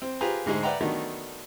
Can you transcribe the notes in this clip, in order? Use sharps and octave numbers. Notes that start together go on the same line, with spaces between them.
C4
F4 G4 G#4 B4 C5 A#5
D2 G#2 D#4 G#4 C5
B4 D5 E5 F#5 G5 A#5
D#3 F#3 A3 B3 D4 D#4